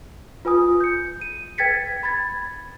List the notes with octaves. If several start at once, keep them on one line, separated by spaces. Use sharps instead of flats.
F4 B4 G#5 D#6
G6 C#7
D#7
B4 G5 G#6 A6 B6 C#7
B5 G#6 A6